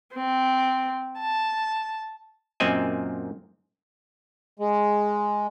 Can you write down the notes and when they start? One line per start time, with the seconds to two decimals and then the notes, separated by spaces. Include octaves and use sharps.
0.14 C4
1.19 A5
2.60 F#2 A#2 C4 D#5 G#5
4.59 G#3